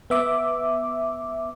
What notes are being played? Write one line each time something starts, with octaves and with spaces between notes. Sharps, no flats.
B3 E5 D6